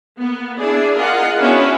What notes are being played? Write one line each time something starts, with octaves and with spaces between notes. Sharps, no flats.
A#3 B3
D4 E4 G#4 D5
F4 G#4 A#4 D#5 F#5
B3 C#4 D4 E4 F#4 B4